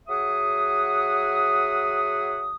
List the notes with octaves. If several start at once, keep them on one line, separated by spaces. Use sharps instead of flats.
F#3 G#4 E5 F#5 D#6